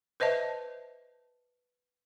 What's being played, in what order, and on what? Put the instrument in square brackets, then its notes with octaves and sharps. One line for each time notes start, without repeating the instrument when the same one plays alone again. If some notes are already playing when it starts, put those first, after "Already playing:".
[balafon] B4 C5 D#5 E5 A5